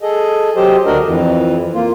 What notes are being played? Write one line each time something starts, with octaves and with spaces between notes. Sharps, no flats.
G#4 A4 D#5
F#3 G4 C5 D#5
D2 A3 D4 F#4 A#4 D#5
F2 E3
A#3 F4